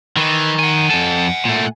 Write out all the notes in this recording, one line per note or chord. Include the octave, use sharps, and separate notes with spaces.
D#3 E3
F#5 G#5
F2 A4
A#2 A3